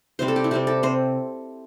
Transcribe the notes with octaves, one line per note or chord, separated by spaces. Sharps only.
C3 G3 C4 C5
A4
G4
E4
C3 G3 C4 G4
A4
C3 C5